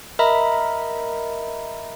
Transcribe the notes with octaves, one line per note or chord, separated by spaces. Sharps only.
A#4 D#5 E5 A#5 B5